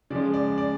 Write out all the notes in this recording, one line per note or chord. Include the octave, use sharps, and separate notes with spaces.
C#3 F3 G#3 D5
D5
D5